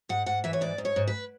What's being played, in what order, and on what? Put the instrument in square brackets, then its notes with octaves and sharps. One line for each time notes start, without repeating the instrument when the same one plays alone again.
[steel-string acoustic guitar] G#2 F#5
G#2 F#5
E3 E5
C#5
G#2 D5
G#2
C#5
G#2
B4